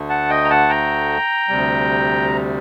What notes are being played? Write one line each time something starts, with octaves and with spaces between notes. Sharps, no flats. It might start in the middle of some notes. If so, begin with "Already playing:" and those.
Already playing: D2 D3 A3
F#5 A5
D#5 G5
A#5
F#5 A5
G5 A#5
D2 C3 G3